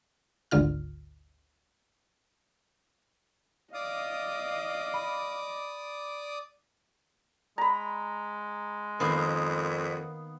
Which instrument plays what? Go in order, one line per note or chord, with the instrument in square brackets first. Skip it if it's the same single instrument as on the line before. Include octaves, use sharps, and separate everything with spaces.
[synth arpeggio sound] G#1 D2 G#2 D3 F4 F6
[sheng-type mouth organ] D5 D6 D#6 [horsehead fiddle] D#5 [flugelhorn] F5
[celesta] B5
[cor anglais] G#3 [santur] A#5 B5
[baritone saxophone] F2 [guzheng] D#3 A#3 [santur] B3